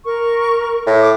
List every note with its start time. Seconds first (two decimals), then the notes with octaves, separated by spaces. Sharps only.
0.05 A#4 C#6
0.86 A2
1.01 D6